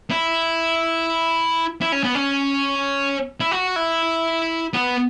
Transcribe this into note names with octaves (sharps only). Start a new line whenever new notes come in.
E4
E4
C#4
B3
C#4
E4
F#4
E4
B3